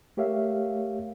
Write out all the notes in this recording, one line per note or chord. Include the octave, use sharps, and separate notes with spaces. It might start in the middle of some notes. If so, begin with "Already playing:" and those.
A3 G4 A#4 C#5 E5 F5